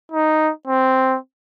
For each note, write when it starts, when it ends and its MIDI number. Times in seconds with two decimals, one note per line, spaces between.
0.12 0.51 63
0.67 1.18 60